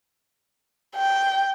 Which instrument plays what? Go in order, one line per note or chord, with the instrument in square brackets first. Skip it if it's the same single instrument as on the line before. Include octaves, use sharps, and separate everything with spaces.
[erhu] G5